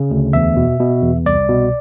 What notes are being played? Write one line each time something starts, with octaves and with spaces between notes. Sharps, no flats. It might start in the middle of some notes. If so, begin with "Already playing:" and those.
Already playing: C#3
D2
E2 E5
B2
B2
E2
C2 D5
B2